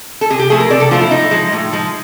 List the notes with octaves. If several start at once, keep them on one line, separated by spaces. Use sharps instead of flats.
A4
C3 G#4
G4
F3 A3 G#4
A#4
C3 D5
A4
F3 A3 F4
E4
A2 D#4
F3 G#3
A2
F3 G#3